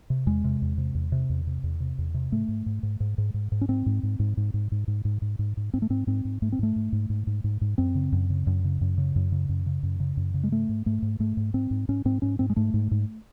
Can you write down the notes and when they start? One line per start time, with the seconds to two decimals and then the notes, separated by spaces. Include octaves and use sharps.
0.10 C3
0.26 E2 G#3
0.44 C3
0.62 E2
0.78 C3
0.95 E2
1.12 C3
1.30 E2
1.47 C3
1.63 E2
1.80 C3
1.98 E2
2.14 C3
2.32 G#2 A3
2.48 G#2
2.66 G#2
2.83 G#2
3.00 G#2
3.18 G#2
3.34 G#2
3.52 G#2
3.61 C#4
3.68 G#2 C4
3.86 G#2
4.03 G#2
4.19 G#2
4.37 G#2
4.54 G#2
4.72 G#2
4.88 G#2
5.05 G#2
5.22 G#2
5.39 G#2
5.57 G#2
5.74 G#2 C4
5.82 A3
5.90 G#2 C4
6.07 G#2 C4
6.25 G#2
6.42 G#2 A3
6.52 C4
6.59 G#2 A3
6.76 G#2
6.92 G#2
7.10 G#2
7.27 G#2
7.44 G#2
7.61 G#2
7.78 F#2 C4
7.95 C#3
8.12 F#2
8.30 C#3
8.47 F#2
8.64 C#3
8.81 F#2
8.98 C#3
9.16 F#2
9.32 C#3
9.49 F#2
9.66 C#3
9.83 F#2
10.00 C#3
10.17 F#2
10.34 C#3
10.44 G#3
10.51 G#2 A3
10.69 G#2
10.86 G#2 A3
11.02 G#2
11.20 G#2 A3
11.37 G#2
11.54 G#2 C4
11.71 G#2
11.88 G#2 C#4
12.05 G#2 C4
12.22 G#2 C#4
12.39 G#2 C4
12.50 G#3
12.56 G#2 A3
12.74 G#2
12.91 G#2